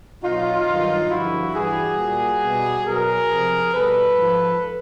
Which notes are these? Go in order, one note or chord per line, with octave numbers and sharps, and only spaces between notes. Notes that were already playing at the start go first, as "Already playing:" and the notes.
B2 F#3 D#4 F4
G2 D#3 F#3
G2 D3 F3 E4 F#4
G2 E3 G3 F#4 G#4
A#2 G3
B2 G3
B2 F#3 G#4 A#4
C3 F3
B2 G3 A4 B4
G#2 F3